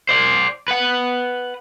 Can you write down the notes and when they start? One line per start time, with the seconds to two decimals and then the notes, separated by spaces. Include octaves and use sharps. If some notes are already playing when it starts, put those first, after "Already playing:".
0.09 C5 D5
0.68 B4 F#5